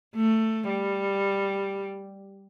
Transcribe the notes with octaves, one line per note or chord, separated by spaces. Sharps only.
A3
G3